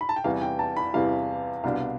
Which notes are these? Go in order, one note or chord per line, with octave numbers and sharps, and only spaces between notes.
B5
A5
G5
E2 C3 E3 G3 F5
G5
A5
B5
E2 C3 E3 G3 F5
C2 B2 B3 D4 F5